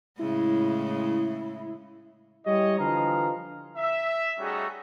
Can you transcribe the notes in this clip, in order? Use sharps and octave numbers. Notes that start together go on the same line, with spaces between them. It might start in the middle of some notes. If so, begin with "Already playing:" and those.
A2 C#3 G#3 E4
G3 G#3 E4 G4 C#5 D#5
D3 E3 F3 B4 F5 A#5
E5
G3 A3 C#4 D#4 F#4 G#4